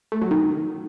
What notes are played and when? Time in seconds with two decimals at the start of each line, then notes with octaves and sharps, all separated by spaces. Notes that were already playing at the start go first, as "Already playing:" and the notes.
0.12 A3
0.21 F#3
0.31 D#3